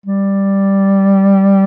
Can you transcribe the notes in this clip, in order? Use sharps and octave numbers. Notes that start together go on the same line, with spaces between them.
G3